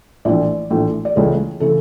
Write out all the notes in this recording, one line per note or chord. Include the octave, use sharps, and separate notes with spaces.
A#1 A2 E3 D5
A#1 A2 E3
D5
C#2 C#3 E3 A3 C#5
C#3 E3 A3 A4